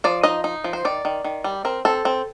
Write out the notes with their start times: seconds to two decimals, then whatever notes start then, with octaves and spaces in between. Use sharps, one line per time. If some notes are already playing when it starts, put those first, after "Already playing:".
0.04 F3 D5
0.23 D#4 D#5
0.44 D#4
0.64 F3
0.73 C5
0.85 D#3 D5
1.05 D#3
1.24 D#3
1.44 G3
1.65 C4 A#4
1.85 C4 A4
2.05 C4